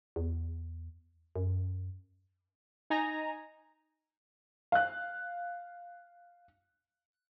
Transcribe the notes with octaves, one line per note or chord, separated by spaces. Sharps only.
E2
F#2
D#4 G#5 A#5
F5 F#6